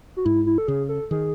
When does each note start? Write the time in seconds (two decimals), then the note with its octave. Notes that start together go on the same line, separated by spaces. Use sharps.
0.17 F#4
0.25 G#2 E4
0.46 E4
0.58 A4
0.68 C#3 G#4
0.89 A4
1.11 D#3 G#4